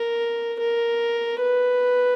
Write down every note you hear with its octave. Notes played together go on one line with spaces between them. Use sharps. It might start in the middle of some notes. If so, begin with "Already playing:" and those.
Already playing: A#4
A#4
B4